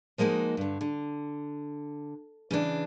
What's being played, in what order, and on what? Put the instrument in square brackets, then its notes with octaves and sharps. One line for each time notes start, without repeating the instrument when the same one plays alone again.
[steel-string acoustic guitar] F3 G#3 A#3 D#4 F#4
G2 D3
D3
C#3 E3 D4